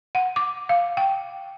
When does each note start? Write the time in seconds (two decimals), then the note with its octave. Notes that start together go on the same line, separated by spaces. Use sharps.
0.15 F#5
0.36 D6
0.69 F5
0.97 G5